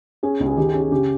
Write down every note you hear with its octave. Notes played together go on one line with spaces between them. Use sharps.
C#4 G#4
C#2
G#4
D#3 G4
G#4
C#4
G#4
C#3 G4